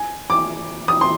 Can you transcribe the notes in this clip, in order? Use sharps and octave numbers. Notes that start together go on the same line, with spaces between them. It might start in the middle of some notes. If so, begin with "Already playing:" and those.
Already playing: G#5
D6
D#6
C6